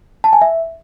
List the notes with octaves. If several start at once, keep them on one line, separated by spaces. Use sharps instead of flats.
A5
G#5
E5